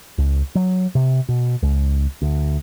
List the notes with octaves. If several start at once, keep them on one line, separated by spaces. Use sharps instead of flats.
C#2
F#3
C3
B2
C#2
D2